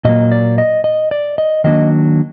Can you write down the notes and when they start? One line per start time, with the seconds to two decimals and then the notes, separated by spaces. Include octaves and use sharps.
0.05 A#2 F#3 A#3 D#5
0.32 D5
0.58 D#5
0.84 D#5
1.11 D5
1.38 D#5
1.64 D#3 F#3 A#3 D4 D#5